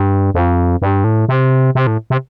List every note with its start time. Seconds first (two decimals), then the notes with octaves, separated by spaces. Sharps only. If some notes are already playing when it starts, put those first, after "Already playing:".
Already playing: G2
0.34 F2
0.82 G2
1.04 A2
1.29 C3
1.75 C3
1.87 A2
2.10 C3